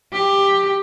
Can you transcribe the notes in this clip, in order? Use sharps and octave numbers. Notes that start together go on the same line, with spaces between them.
G4